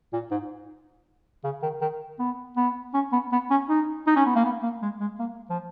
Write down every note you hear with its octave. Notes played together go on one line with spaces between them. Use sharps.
A#2
G#2
C#3
D#3
D#3
B3
B3
C#4
B3
B3
C#4
D#4
D#4
C#4
B3
A#3
B3
A#3
G#3
G#3
A#3
F3